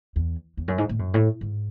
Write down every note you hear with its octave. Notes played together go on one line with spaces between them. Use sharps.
E2
E2
F#2
G#2
A2
F#2
A2
G#2